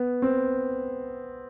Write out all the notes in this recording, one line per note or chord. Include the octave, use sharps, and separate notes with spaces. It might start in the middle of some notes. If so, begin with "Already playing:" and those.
Already playing: B3
C4